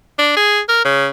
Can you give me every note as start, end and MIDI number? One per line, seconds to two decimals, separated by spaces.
0.19 0.31 62
0.37 0.60 68
0.69 0.81 70
0.85 1.08 49